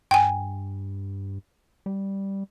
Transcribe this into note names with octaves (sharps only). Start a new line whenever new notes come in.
G2 G5 G#5
G3